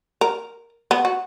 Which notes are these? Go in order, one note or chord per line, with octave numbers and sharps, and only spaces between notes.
A#4
B3
F#4